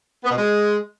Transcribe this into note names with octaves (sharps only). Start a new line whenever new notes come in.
B3
B2
G#3